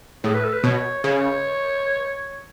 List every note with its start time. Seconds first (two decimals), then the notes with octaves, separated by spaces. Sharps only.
0.24 A2 G#4
0.34 B4
0.44 A4
0.53 B4
0.64 B2 C#5
1.04 C#3 C#5